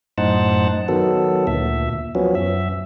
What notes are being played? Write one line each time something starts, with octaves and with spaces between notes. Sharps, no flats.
F#2 A2 D#4 C5 F#5 A5
D#3 F#3 B3 A4
D2 A#2 E5
F3 F#3 B3 C#4
F#2 E5